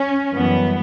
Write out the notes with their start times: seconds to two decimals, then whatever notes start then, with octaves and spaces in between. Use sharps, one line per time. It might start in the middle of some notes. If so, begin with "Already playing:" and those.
Already playing: C#4
0.33 F#2 E3 G3 B3